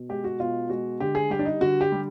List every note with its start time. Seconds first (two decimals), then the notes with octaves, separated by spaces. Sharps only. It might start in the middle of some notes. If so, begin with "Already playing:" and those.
Already playing: B2
0.09 G#3 G4
0.24 F#4
0.40 B2 F4
0.70 G#3 F#4
1.00 D3 G4
1.15 G#4
1.30 G3 G4
1.39 D4
1.45 D#4
1.61 D3 F#4
1.81 G4
1.92 G3